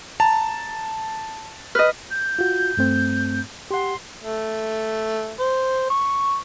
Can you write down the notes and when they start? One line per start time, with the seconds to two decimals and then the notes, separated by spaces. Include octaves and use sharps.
0.20 A5 A#5
1.75 B4 D#5 F6
2.10 G6
2.39 F4 F#4
2.77 G2 A3 C4
3.71 G4 F#5 C6
4.20 A3
5.40 C5
5.90 C#6